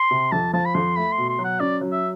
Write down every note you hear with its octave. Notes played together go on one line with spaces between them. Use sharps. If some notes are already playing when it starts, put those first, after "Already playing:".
Already playing: C6
C3
F2 A5
F3 A5
B5
F2 C6
A3 B5
C6
B2
C6
F#3
F#5
C#4 D5
F#3
E5